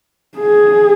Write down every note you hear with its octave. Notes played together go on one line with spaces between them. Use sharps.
G#4